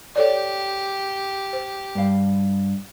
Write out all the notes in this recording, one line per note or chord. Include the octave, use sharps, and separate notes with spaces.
G4 A4 C#5 D5
C5
G2 F5